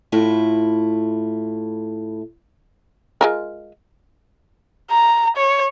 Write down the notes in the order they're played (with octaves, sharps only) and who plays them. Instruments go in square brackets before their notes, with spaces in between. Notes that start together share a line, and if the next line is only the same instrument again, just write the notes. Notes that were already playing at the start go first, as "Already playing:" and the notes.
[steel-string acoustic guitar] A2 A3 E4 F4
[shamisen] G#3 F4 A#4
[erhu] A#5
C#5